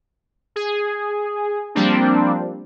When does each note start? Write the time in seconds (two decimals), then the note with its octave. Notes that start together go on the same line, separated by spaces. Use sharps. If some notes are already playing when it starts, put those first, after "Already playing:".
0.56 G#4
1.75 F3 G3 A#3 C4 D4